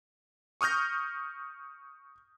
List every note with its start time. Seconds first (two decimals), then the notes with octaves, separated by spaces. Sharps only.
0.61 C#6 D#6 F6 G6 A#6